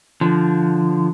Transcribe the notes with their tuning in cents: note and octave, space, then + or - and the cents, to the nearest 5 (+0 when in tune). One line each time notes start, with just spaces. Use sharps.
D3 +0 F3 -15